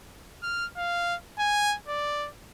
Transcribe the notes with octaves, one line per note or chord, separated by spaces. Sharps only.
F6
F5
G#5
D5